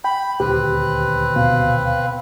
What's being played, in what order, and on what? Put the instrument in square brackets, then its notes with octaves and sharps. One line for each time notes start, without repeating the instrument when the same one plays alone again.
[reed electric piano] G5 [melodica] B5
[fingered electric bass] D#1 D2 [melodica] C4 B4 [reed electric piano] G4
[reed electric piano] B2 [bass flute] F5